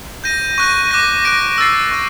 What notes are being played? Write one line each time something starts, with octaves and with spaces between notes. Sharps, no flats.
G6 A#6 D#7
C#6 F#6 A#6 D#7
D6 F#6 A#6
F#6 A#6 D7
E6 A6 C7
C#6 F#6